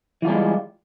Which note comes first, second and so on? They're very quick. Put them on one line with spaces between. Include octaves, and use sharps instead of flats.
E3 F4 G3 A#3 G#3